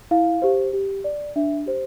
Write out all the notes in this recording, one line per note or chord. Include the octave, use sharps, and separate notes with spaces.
E4 F5
G4 C5
G4
D5
D4 E5
G4 C5